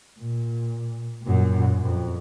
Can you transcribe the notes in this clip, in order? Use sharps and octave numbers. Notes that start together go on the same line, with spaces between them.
A#2
F#2 A#2
F2